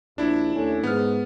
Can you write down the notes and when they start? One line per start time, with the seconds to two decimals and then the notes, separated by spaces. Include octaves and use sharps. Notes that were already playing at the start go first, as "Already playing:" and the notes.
0.18 A#1 D4 E4
0.54 D#2 A3 C#4
0.83 G#2 B3 F6